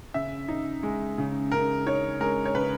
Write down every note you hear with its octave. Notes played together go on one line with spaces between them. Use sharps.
C#3 E5
D#4
G#3
C#3
C#3 A#4
D#4 C#5
G#3 A#4
C#5
C#3 B4